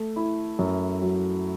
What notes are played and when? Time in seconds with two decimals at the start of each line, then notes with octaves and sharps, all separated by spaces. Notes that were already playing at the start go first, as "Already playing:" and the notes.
Already playing: A3
0.16 E4
0.59 F#2
1.02 F#3